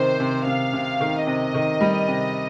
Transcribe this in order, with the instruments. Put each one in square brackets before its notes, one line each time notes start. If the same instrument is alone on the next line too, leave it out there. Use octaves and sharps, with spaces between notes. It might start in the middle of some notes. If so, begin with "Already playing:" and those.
Already playing: [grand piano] C3 D#3 [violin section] C5
[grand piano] C3
[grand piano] C3 [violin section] F5
[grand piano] C3
D#3
[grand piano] C3 [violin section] D#5
[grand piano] D#3
G3
C3